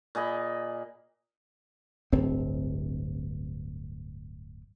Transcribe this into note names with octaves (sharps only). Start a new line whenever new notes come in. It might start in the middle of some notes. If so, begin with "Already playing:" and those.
A#2 G#4 D#5 B5
D1 G1 C4